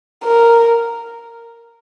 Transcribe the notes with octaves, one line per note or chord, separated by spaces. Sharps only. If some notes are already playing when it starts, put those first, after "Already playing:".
A#4